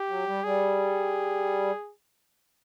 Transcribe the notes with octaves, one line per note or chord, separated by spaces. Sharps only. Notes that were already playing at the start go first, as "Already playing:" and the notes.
Already playing: G4
F#3
G3
G3 G#4